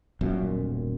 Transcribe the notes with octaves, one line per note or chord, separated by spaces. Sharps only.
D#1 B1 F#2 A#2